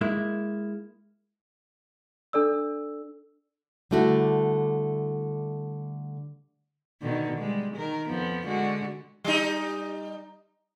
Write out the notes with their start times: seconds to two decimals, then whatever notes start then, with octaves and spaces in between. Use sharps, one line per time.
0.01 G#3 A#3 E4
2.33 D4 A4 D5 E6
3.91 D3 G3 A3 E4 F#4
7.01 B2 D3 D#3
7.38 G3 G#3
7.75 D#3 A#4
8.09 F2 F3 B3
8.45 D3 G#3 F#4
9.24 G3 D#4